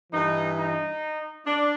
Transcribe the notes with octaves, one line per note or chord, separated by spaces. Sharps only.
G2 E3 D#4
D#4
D4